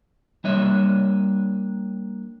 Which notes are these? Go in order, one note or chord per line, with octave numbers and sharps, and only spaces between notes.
G3 A#3 D4 C#5 D#5 E5